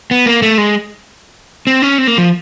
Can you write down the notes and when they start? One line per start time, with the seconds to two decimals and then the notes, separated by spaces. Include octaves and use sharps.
0.11 B3
0.26 A#3
0.42 A3
0.58 G#3
1.67 C4
1.82 C#4
1.98 C4
2.07 A#3
2.18 F3